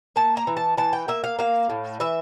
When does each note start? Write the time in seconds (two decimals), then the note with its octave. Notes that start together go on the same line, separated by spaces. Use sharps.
0.16 A#3 A5
0.37 A#5
0.47 E3
0.57 A5
0.77 E3 A5
0.93 G5
1.08 A#3 E5
1.24 F5
1.39 A#3 F5
1.70 A2
2.00 E3 E5